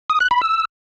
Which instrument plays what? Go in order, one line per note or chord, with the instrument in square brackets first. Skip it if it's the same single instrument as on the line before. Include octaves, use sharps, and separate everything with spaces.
[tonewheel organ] D#6
F#6
B5
E6